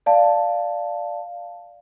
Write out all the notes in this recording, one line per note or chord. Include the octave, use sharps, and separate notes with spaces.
D5 F5 A5